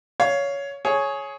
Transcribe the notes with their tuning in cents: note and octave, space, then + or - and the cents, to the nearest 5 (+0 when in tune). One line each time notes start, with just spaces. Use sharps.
C#5 +15 F5 +0
G#4 +15 C#5 +0